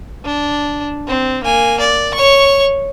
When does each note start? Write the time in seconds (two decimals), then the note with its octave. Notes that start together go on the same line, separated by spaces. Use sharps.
0.25 D4
1.08 C4
1.43 A#3 G#5
1.80 D5
2.14 C#5 C#6